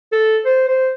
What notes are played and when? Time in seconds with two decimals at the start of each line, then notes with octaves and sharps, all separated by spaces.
0.12 A4
0.45 C5
0.68 C5